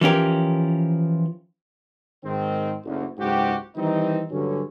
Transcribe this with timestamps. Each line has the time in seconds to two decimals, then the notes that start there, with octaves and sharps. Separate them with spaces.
0.01 E3 F3 C#4 G4 A#4
2.24 G#2 D#3 C4
2.85 F#1 D2
3.18 F#1 C#2 G#2 F#4 G4
3.76 D#3 E3 G3 C4 D#4
4.30 G2 D3 F#3 C#4